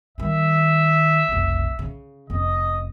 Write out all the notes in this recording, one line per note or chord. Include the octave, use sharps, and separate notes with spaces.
D#3 G3 E5
F1 B1
C#3
F1 C#4 D#5